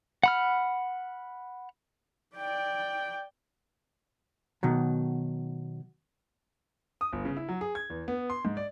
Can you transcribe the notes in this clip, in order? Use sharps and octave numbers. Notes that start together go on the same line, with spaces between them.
F#5 B5 F6
D5 G5
B2 D#3 F#3
D#6
G1
C#3
E4
F#3
G#4
G#6
E2
B3
C6
G#2
D5